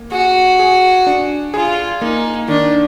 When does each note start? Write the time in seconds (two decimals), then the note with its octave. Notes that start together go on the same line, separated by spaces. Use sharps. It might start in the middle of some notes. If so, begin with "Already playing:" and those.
Already playing: A#3
0.12 F#4 G#4
0.59 G#4
1.07 D4
1.54 F4 G#4
2.01 A#3 D#4
2.48 D#3 D4